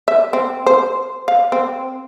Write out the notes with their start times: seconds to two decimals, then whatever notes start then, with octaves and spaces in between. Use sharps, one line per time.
0.08 E5
0.33 C4
0.66 C5
1.28 F5
1.52 C4